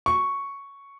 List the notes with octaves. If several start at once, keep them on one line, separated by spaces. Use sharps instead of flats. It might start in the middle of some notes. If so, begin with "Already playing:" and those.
C#6